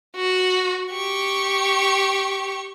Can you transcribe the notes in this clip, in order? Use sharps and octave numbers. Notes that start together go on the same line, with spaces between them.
F#4
G4 C#6